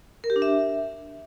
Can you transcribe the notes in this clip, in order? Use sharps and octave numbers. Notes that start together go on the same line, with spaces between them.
A#4
G4
D4
E5